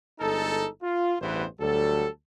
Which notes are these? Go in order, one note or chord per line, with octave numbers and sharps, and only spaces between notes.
G1 G#3 D#4 A4
F4
A1 E2 G2 E3 B3 C5
D2 F#3 G3 A4